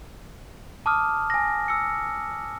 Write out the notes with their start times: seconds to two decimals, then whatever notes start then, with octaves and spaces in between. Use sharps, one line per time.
0.86 A5 D6 D#6 F6
1.30 G#5 A#6
1.68 E6 C#7